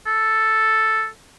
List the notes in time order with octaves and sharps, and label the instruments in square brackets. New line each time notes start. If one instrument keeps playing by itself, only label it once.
[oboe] A4